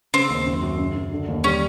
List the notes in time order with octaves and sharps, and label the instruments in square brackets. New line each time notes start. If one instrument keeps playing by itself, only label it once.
[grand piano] C#3 [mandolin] C4
[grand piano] D#2
F#2
F#2
C#3
F#2
D3
D#2
[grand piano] G3 [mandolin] C#4